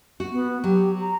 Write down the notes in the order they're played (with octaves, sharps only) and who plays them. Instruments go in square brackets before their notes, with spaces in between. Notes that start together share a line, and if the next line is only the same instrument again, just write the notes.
[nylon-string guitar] F#4
[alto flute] B3
[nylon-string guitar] F#3 [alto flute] G4
[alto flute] A#5